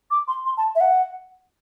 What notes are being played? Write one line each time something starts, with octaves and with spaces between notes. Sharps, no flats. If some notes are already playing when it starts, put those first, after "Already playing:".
D6
C6
C6
A5
E5
F#5